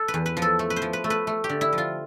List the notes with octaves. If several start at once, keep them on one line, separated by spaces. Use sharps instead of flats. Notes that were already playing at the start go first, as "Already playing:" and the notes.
Already playing: A4
B4
E2
B4
F3
A4
A3
B4
C5
F3
B4
A3
B4
A3
G4
D3
E4
F3
F4